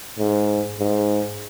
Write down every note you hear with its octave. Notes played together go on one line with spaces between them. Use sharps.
G#2
G#2